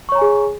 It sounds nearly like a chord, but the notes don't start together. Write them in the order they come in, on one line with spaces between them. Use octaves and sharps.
C#6 C#5 A#5 G#5 G#4